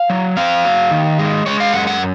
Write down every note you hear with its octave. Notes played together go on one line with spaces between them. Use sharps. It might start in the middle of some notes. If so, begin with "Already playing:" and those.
Already playing: F5
F#3
C4 F5
F#3
D#3
G#3
G#3 C#5
F5
F#2 F#5
F#5